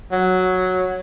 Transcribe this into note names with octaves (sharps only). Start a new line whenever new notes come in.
F#3